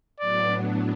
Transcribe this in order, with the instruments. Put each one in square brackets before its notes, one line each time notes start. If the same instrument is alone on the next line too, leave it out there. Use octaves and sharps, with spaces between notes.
[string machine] A2 F#3 B3 D4 [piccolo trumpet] D5